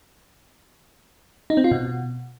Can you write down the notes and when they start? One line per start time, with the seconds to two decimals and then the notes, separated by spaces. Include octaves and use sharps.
1.50 D#4
1.57 C4
1.64 F4
1.71 B2